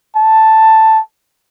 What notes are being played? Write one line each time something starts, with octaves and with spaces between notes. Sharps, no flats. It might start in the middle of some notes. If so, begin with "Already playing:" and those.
A5